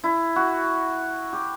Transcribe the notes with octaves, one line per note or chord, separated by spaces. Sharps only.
E4
F#4
G4